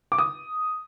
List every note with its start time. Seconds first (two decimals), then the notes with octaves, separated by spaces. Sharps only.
0.12 D6
0.18 D#6